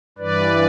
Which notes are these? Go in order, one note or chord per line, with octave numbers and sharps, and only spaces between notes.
G2 E3 B4 D5